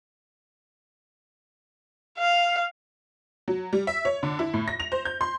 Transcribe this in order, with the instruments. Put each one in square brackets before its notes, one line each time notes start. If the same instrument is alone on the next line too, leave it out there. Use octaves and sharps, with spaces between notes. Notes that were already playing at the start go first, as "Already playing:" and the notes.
[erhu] F5
[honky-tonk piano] F#3
G3
E5
C#5
D3
E4
A2
A#6
F7
C5
G6
C6